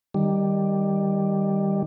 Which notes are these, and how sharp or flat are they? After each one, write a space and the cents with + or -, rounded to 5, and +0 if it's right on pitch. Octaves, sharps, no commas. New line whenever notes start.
D#3 -5 G3 +5